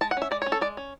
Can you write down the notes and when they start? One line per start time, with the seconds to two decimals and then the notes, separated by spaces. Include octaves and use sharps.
0.01 G#3 A5
0.11 F#5
0.17 C#4 E5
0.31 G#3 D5
0.42 C#5
0.46 C#4
0.52 A4
0.61 G#3 D5
0.77 C#4